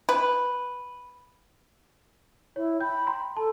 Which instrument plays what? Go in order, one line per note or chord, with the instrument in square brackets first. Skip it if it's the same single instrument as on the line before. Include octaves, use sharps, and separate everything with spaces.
[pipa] B4
[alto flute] E4 [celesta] C#5
[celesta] G5 G6 [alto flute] B5
[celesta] G5 A#5 C6
[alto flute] A4 [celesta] A5